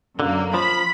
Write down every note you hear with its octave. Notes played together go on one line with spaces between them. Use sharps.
F#2 D3 A#3
F3 B5 B6